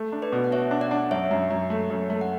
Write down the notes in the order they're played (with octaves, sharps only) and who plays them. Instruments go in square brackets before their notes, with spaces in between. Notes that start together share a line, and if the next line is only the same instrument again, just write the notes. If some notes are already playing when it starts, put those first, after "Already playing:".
Already playing: [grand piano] A3
D4
[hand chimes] B4 D5
[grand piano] B2
[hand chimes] F#5
[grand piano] F#4 [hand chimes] C#5 E5
[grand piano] D4
[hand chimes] D5 F#5
[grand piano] D4
[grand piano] F#2 [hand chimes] C#5 E5
[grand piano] F#2
F#2
A3
F#2
A3
[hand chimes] F#5